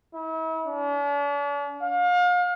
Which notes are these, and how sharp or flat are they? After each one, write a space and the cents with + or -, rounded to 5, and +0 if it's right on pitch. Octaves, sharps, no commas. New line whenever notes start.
E4 -40
D4 -45
F5 +35